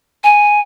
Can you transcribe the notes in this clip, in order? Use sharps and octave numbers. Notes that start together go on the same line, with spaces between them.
G#5